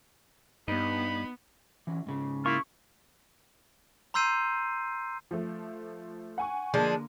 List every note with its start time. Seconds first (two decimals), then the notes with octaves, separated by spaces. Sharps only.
0.68 G2 B3 D#4 B5
1.87 E3 F#3 C#4
2.06 G#2 C#3
2.46 A#3 E4 F4 C#6
4.14 A#5 C6 E6 G6 C7 D#7
5.31 F3 A3
6.38 F#5 G#5 C#6
6.74 D3 F3 G#3 A#3 D4